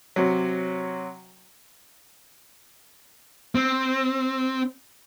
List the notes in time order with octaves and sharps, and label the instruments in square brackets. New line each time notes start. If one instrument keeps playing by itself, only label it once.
[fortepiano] C3 F#3
[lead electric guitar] C4